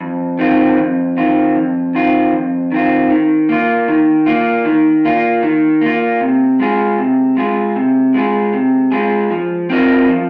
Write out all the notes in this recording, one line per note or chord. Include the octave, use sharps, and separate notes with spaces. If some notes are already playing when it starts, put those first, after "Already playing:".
F2
D#3 C4 F4
F2
D#3 C4 F4
F2
D#3 C4 F4
F2
D#3 C4 F4
D#3
A#3 F4
D#3
A#3 F4
D#3
A#3 F4
D#3
A#3 F4
C3
G#3 F4 G#4
C3
G#3 F4 G#4
C3
G#3 F4 G#4
C3
G#3 F4 G#4
F3
C4 F4 A#4 D#5
F3